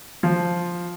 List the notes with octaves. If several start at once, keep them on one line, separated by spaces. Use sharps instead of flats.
F3